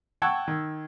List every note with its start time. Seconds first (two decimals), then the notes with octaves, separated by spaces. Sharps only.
0.22 F#5 G5 A5 C#6 E6 G#6
0.48 D#3